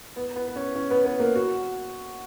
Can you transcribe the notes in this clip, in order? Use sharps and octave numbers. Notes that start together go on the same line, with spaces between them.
B3 B4
B3 B4
B4
C#4 C#5
C#4 C#5
B3 B4
B3 B4
A#3 A#4
F#4